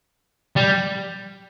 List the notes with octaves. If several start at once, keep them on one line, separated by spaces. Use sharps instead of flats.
G3